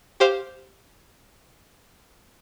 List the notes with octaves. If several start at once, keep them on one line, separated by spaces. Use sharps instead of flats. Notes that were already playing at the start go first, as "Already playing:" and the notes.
G4 C5 F5